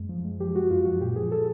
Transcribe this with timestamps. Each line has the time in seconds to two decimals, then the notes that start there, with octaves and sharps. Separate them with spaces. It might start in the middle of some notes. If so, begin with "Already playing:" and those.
Already playing: F#2 G#3
0.09 F3
0.24 G#3
0.40 F3 G4
0.55 G#3 F#4
0.70 F#2 F4
0.85 F3 F#4
1.01 A#2 G4
1.16 F3 G#4
1.32 A4